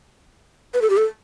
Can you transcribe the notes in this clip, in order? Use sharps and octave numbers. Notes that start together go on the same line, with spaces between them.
B4
A4
G4
A4